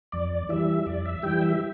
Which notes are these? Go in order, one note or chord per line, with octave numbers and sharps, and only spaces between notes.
F2 D5
E3 G3 E5
F2 D5
E5
E3 G3 G5
E5